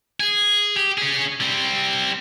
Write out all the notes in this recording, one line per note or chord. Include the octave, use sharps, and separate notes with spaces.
G#4
G4
C#4 G#4
G3 C4